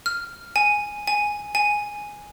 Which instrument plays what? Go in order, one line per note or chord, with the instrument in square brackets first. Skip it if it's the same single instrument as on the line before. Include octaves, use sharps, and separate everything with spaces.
[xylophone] F6
G#5
G#5
G#5